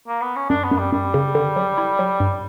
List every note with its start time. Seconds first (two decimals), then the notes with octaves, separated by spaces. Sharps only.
0.08 A#3
0.21 B3
0.36 C#4
0.49 F#2 D4
0.64 B3
0.71 F#2
0.78 G3
0.92 F#2 G3
1.14 C#3
1.35 D3
1.56 F#3
1.78 E4
1.99 F#3
2.20 G2